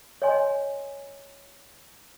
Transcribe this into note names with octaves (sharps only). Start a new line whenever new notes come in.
C#5 D#5 G#5 C6